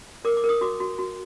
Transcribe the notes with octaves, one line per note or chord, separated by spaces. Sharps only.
A#4 D6
D6
A#4
D#6
F#4 D6
F#4
F#4